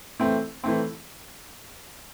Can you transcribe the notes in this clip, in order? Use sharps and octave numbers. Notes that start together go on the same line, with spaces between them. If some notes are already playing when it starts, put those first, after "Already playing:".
E3 A3 C4
E3 A3 C4